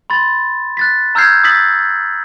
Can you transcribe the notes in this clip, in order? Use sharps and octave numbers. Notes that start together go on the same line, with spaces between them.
B5 C6 A6
F#6 A6 B6
A#5 E6 F6 G6 G#6 C7
D#6 E6 A6 B6 F#7